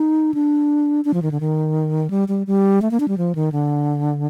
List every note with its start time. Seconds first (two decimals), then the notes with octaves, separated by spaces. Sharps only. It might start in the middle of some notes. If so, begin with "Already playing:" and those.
Already playing: D#4
0.34 D4
1.05 D4
1.14 F3
1.22 D#3
1.31 D3
1.40 D#3
2.10 G3
2.28 G3
2.47 G3
2.82 A3
2.91 A#3
3.00 D4
3.08 G3
3.18 F3
3.35 D#3
3.52 D3